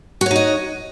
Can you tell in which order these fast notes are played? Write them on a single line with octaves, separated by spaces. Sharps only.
F#4 C#5 D#4 D#5